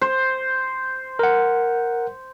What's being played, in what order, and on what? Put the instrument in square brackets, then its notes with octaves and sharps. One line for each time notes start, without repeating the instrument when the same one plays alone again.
[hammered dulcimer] C5
[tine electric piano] A#4 F#5